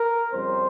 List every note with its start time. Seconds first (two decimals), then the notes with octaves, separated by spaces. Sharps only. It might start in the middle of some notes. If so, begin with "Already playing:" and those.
Already playing: A#4
0.32 F2 C#3 G3 C4 C5